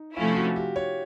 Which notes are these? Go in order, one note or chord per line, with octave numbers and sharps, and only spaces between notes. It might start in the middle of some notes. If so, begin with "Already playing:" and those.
Already playing: D#4
C3 F3 A3 C#4 E4 F4
F#4
G4
C#5